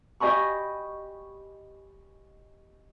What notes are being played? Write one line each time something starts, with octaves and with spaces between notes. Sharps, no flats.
G4 D#5 G#5 B5 C#6